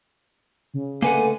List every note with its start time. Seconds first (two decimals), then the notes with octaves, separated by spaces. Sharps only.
0.74 C#3
1.02 D3 A3 A#3 B4 F#5 G#5